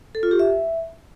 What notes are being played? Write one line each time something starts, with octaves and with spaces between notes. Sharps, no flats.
A4
F4
G4
E5